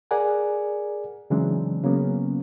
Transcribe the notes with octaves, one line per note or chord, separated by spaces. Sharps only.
G#4 A#4 D5 F#5 G#5
C#3 E3 F#3 G#3 C4 D4
C#3 F#3 A#3 B3 C#4